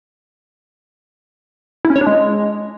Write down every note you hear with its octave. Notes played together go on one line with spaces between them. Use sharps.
E4
C#4
C#5
D4
G#3